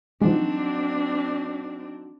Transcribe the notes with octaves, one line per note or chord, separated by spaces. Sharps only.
F3 F#3 G#3 C4 D4 D#4 F#4